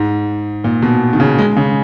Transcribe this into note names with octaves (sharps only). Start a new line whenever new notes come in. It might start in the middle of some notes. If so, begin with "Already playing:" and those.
Already playing: G#2
A#2
B2
D#3
C#3
G#3
C#3